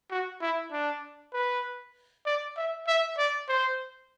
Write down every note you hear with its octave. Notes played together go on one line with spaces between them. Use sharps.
F#4
E4
D4
B4
D5
E5
E5
D5
C5